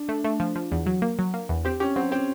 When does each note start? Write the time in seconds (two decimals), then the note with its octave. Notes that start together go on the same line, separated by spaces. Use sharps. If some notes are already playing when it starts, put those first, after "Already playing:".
Already playing: D4
0.09 A3
0.24 A3
0.40 F3
0.56 F3
0.71 E2
0.86 F#3
1.02 A#3
1.19 F#3
1.34 A#3
1.49 E2
1.65 C4 G4
1.80 C#4 G4
1.96 F#3 C4
2.11 C4 G4